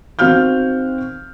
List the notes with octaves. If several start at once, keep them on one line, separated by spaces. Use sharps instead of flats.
D#3 C4 F#4 F5 F6 G6